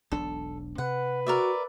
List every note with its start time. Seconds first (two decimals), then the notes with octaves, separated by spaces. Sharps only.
0.12 E1 B1 D4 A4
0.78 C3 B4 F#5
1.27 F#4 A#4 D5 E5